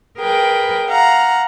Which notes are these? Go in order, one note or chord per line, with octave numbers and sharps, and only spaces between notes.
G#4 A#4 B4 G5
F5 F#5 A#5